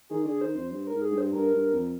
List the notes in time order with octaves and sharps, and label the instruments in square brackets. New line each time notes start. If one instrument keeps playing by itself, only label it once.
[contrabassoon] D#3 [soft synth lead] G#4
[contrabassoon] D3 [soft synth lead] G#4
[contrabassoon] D#3 [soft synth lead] C5
[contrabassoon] F2 [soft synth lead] C5
[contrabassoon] G2 [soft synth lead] C5
[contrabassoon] G#2 [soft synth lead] A#4
[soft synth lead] G#4
[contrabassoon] G2
[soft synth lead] C5
[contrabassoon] G2 [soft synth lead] A#4
[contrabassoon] G2
F2